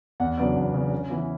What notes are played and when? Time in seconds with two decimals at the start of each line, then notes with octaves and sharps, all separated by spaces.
0.20 E2 F#5
0.38 C#3 F#3 B3 D4 D5
0.56 E2
0.74 C#3 F#3 B3 D4
0.92 C#3
1.10 E3 B3 E4